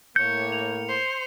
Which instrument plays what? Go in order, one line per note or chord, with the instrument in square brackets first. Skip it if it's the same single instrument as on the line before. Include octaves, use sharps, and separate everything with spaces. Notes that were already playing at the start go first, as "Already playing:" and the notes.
[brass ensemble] A2 A#3 [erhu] C#5 [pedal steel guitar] G6 [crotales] C#7
[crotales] F7
[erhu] C5